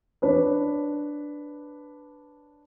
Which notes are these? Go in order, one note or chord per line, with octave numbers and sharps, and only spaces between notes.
D4 B4 C#5